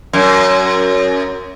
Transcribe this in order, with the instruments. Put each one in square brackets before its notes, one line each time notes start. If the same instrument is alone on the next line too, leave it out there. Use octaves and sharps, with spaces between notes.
[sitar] F#2